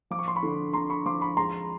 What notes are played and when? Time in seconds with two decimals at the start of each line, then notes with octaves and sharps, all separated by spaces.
0.11 F3 D6
0.19 C#6
0.28 C6
0.35 B5 C#6
0.43 D3
0.73 D3 A#5 C6
0.90 B5 C#6
1.06 F3 C6 D6
1.21 B5 C#6
1.37 G#3 A#5 C6